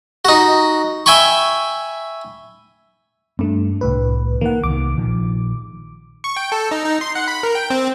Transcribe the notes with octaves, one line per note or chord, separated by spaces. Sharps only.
D#4 F#4
E5 G5 G#5 B5 C#6
G2 A3 C4 D4
C2 A2 B4
D#3 A#3 F#5
C2 D#3 D6
A#1 D#3 F3
C#6
G5
A4
D#4
D#4
C6
F#5
B5
A#4
G5
C4